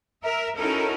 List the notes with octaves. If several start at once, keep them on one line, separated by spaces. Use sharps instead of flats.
A#4 E5
C#4 D#4 E4 F#4 A4 A#4